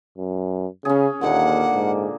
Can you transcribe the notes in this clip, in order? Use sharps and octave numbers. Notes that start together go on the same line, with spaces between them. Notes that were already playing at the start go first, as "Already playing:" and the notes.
F#2
C#3 C#4 G#4
D#2 A#2 D3 A#3 F#5
G#2